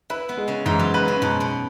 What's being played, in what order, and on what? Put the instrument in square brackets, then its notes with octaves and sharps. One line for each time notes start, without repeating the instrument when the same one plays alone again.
[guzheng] E4 [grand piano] B4
[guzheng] B3
[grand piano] G#3
[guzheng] C#3
[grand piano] G#2 [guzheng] E3
[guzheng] F#3
[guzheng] F#3 [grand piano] B4
[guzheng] C#3
[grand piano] G#2 [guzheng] B2
[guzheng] B2